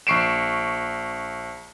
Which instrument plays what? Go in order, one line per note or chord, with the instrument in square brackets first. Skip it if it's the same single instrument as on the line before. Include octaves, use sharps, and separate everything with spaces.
[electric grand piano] A#1 C#6 C7 D7 E7